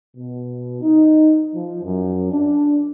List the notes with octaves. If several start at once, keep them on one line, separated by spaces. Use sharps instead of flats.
B2
D#4
F3
F#2
D4